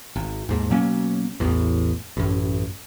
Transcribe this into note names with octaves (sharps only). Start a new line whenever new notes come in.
G#1
D#2 G#2
B2 F#3 A#3 C#4
A1 E2
A1 F#2